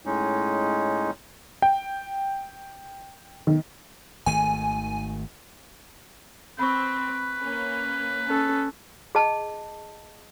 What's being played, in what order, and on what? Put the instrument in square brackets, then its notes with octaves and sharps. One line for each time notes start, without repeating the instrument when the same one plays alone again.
[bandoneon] A2 G#3 C#4 D#4
[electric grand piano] G5
[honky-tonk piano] D#3
[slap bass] G#1 D#3 A3 [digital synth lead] G#5
[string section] C4 [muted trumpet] B4 [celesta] B5 C#6
[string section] A#3 C#4
[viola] C#4 A4
[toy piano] G#4 D#5 A5